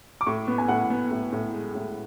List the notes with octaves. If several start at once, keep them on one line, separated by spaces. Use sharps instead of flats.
D6
A2 C#6
B3
G#5
A2 F#5
B3
A2
A2
G#3
A2